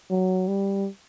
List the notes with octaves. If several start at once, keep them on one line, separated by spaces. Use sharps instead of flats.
F#3
G3